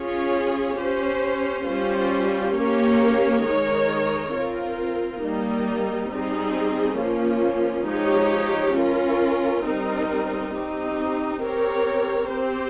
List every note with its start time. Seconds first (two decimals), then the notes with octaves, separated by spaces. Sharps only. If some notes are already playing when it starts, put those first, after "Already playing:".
Already playing: C#4 F4 G#4 C#5
0.78 C#4 G4 C5
1.67 G3 C#4 F4 C5
2.55 A#3 C#4 G4 A#4 C#5
3.44 D#3 G#3 D#4 A#4 C#5
4.32 C4 F4 A#4
5.21 G3 A#3 D#4
6.10 G3 C4 D#4 G#4
6.98 F3 A#3 C#4 F4
7.87 F3 G#3 D#4 G4 C#5
8.75 C#4 F4 A#4
9.64 G3 C4 D#4 A#4
10.53 C4 D#4 G4
11.41 C4 G4 A#4 C#5
12.29 C4 G4 C5